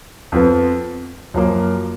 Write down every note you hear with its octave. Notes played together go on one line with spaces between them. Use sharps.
F2 F3 B3
F#2 F3 A#3